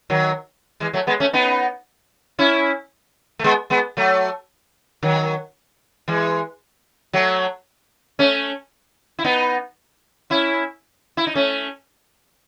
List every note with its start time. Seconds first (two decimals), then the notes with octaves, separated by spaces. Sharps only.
0.10 D#3 F#3
0.80 E3 G#3
0.93 F#3 A3
1.07 G#3 B3
1.20 A3 C#4
1.33 B3 D#4
2.39 C#4 E4
3.39 A3
3.44 G#3 B3
3.70 G#3 B3
3.97 F#3 A3
5.03 D#3 F#3
6.08 E3 G#3
7.13 F#3 A3
8.19 A3 C#4
9.19 E4
9.24 B3 D#4
10.30 C#4 E4
11.17 E4
11.27 D#4
11.35 A3 C#4